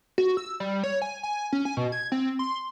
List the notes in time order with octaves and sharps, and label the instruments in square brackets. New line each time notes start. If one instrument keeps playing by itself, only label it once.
[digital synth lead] F#4
E6
G3
C#5
G#5
G#5
C#4
G#5
B2
G#6
C4
C6